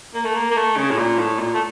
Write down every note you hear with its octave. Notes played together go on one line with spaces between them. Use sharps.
A#3
A3
A#3
A#3
A3
C#3
A2
A#2
A2
A#2
A3